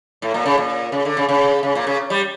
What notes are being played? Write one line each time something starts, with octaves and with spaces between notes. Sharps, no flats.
A2
A#2
C#3
A#2
C#3
D3
C#3
C#3
C#3
A#2
C#3
G3